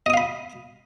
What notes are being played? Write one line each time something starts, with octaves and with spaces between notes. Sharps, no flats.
D#5 F5 B5 D#6